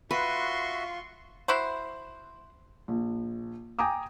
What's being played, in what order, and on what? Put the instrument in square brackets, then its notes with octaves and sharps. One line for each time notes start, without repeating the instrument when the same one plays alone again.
[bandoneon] F4 [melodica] F#4 E5 [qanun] B4 [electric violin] C6 C#6
[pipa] E4 F#4 C5
[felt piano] A#1
G5 G#5 A#5 D6 D#6